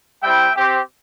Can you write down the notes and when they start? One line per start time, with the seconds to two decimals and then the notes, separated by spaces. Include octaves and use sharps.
0.22 G3 C4 E4 E5 G5
0.55 C4 G4